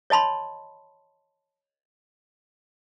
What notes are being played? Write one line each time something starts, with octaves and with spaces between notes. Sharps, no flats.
C#5 D#5 A5 B5 C6